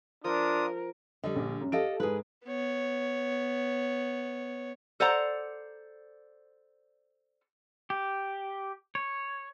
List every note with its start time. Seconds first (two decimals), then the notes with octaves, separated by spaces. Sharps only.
0.24 F3 D4 F4 A#4 D#6
1.24 D3 G3 D#5
1.36 A#1
1.61 F#2
1.72 G4 A4 D#5 F5 D7
2.00 G#2 G#3 G#4 B4
2.46 B3 C#5
5.00 A4 C5 D5 F#5 A#5
7.90 G4
8.95 C#5